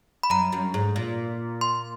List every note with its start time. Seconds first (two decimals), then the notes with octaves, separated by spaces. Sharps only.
0.23 B5
0.30 F#2 A#5
0.52 F#2
0.74 G#2
0.96 A#2
1.61 C6